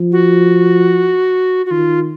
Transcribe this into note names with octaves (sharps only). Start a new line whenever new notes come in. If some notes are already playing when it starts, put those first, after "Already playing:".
Already playing: F3
F#4
F#4
D#3 F4